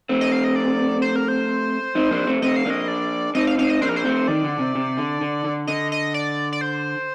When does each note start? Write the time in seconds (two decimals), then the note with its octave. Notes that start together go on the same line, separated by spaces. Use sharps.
0.09 A3 C4
0.21 D#5
0.32 F5
0.44 D#5
0.56 D5
1.02 C5
1.16 A#4
1.28 C5
1.95 C4 D#4
2.11 A#3 D4
2.27 A3 C4
2.42 A3 C4 D#5
2.56 F5
2.66 A#3 D4 D#5
2.88 D5
3.35 C4 D#4 D#5
3.47 F5
3.58 C4 D#4 F5
3.69 D#5
3.81 A#3 D4 C5
3.89 A#4
3.96 C5
4.05 A3 C4
4.28 D#3 D5
4.44 D3
4.59 C3
4.75 C3
4.98 D3
5.21 D3
5.44 D3
5.67 D3 D#5
5.92 D#5
6.14 D5
6.52 D5
6.61 C5